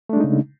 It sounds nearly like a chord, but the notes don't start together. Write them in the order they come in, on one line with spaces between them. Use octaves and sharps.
A3 D4 G#3 D#4 C#3